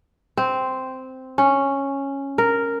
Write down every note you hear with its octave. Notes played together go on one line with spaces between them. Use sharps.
C4
C#4
A#4